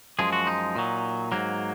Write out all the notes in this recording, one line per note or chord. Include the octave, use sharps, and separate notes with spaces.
F#2 F3 G#3 G#4
F#4
D#4
A#2 F#3
G#2 F#3 A#3